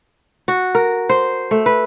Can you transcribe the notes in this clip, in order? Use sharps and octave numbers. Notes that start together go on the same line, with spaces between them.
F#4
A#4
C5
A3
B4